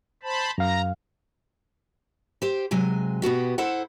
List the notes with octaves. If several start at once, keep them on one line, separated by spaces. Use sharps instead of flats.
C5 A5 B5
F#2 F5 A#5
G4 C5
C3 F#3 G#3 G#5
B2 B3 F#4 G4
E4 A4 C5 F#5